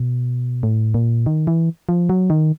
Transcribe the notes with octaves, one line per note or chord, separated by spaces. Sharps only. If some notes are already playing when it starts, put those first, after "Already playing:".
Already playing: B2
A2
A#2
D#3
E3
F3
F#3
D#3